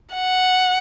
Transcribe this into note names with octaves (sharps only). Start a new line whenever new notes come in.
F#5